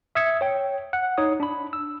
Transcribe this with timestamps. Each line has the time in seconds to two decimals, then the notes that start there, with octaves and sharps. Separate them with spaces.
0.15 E5 D#6 E6 G#6 C#7
0.41 C#5 G5
0.93 F#5
1.18 D#4 C#5 D#6
1.40 D4 B5
1.73 E6